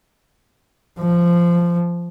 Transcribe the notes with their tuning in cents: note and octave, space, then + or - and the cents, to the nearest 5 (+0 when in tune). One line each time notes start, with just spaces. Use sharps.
F3 -15